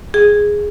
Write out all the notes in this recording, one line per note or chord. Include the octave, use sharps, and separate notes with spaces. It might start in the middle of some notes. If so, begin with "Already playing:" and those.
G#4